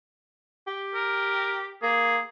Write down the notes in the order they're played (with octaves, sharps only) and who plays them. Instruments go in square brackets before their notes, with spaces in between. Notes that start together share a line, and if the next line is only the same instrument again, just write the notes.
[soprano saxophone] G4
[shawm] A#4
[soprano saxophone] A#3 [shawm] G#4